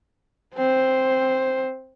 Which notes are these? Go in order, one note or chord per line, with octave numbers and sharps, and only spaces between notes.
C4 C5